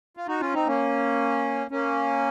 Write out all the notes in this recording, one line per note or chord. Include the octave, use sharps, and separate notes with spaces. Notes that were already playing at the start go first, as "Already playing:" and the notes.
F4
D#4 F#4
C#4 F4
C4 D#4
A#3 C#4
A#3 C#4